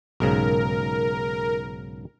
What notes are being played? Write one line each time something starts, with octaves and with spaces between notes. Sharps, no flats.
B1 G#2 C#3 A#4